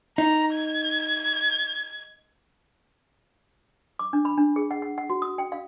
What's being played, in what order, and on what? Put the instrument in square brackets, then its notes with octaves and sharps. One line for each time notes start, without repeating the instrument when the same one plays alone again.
[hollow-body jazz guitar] D#4 [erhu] A#5
[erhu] G#6
[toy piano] D6
D4
B5
D4
G#4
F#5
F#5
F#5
F#4
D#6
G5
F5